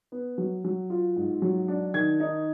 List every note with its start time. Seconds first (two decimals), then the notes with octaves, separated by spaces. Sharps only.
0.12 B3
0.38 F#3
0.64 F#3
0.90 F4
1.16 G#2
1.42 F#3
1.68 D4
1.94 D#3 G#6
2.20 D#4